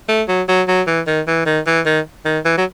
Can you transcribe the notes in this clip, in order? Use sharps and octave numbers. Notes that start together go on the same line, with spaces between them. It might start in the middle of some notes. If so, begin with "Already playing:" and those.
A3
F#3
F#3
F#3
E3
D#3
E3
D#3
E3
D#3
D#3
E3
F#3